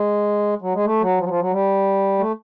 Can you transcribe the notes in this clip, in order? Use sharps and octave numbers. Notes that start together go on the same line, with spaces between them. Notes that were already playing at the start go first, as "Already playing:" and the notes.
Already playing: G#3
F#3
G#3
A3
F#3
F3
F#3
F3
F#3
G3
A3